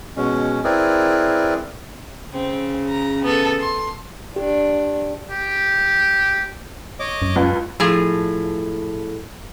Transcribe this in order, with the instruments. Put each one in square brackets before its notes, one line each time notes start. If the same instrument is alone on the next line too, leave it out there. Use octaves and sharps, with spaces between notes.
[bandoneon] B2 G#3 C#4
C4 E4 G#4 A#4 B4 D5
[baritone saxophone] C#3 [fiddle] C4
[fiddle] A#5
B3 A4
C6
[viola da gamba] D4 [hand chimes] G4
[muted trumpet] G4
[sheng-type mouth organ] C#5 D#5 D6
[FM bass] F#2
[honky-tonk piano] C#2
[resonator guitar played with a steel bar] A2 F3 G#4